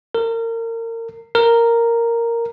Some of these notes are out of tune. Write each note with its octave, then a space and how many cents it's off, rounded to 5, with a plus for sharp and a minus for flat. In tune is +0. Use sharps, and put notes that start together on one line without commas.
A#4 -30
A#4 -5